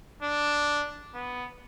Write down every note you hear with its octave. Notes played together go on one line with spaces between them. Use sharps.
D4
B3